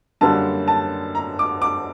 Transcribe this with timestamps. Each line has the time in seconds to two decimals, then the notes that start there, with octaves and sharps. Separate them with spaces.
0.21 F#2 D3 G3 A#3 C#4 A5
0.68 A5
1.15 A#5
1.39 D6
1.62 D6